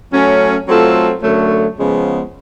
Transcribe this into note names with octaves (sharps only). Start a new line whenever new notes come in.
F#3 A3 C#4
F#3 A3 C4 F4 A4
F#2 D3 F#3 A3
C#3 F3 G#3 B3